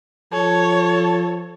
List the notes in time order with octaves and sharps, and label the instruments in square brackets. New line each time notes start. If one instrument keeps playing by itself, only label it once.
[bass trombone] F3 [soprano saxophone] A4 [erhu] C#5